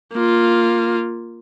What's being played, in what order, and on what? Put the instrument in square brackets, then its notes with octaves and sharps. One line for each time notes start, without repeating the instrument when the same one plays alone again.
[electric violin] A#3 F4